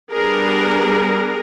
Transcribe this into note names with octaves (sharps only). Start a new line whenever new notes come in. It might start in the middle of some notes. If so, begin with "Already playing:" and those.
G3 B3 D4 G#4 A#4